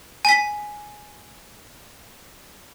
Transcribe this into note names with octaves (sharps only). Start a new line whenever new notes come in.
G#5 B6